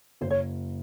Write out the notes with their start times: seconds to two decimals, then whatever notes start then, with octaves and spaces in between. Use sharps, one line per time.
0.21 F#1 C5
0.31 C#5